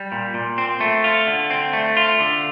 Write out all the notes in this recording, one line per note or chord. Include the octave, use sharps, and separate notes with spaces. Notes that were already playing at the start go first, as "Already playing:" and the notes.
Already playing: G3
A#2
A#2
C4
A3
F4
D3
C4
A3
F4
D3